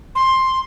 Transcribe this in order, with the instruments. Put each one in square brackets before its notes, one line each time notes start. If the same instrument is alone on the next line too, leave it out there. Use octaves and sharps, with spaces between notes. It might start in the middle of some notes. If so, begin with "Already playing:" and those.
[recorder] C6